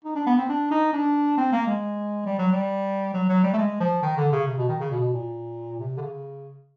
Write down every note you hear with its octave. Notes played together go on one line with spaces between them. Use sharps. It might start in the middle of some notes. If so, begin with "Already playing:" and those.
D#4
D4
B3
C4
D4
D#4
D4
C4
A#3
G#3
G3
F#3
G3
F#3
F#3
G3
A3
G#3
F3
D#3
D3
C#3
C3
B2
D#3
C#3
B2
A#2
C3
D3
C#3